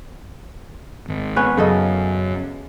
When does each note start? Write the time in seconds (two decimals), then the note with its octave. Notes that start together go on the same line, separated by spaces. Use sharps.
1.08 G#1
1.36 B3 C#4 B4
1.57 F#2 C#3 A4 D#5